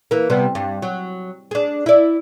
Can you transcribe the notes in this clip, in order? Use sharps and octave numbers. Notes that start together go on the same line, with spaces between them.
E3 A#3
C3 G3 B3
G2
F#3
D4 G#4
E4 D5